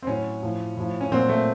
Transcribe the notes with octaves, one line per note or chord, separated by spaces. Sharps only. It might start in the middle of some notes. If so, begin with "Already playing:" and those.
C4
A2 F#3 C#4
A2 F3
A2 F3
C#4
A#2 F#3 C4
A3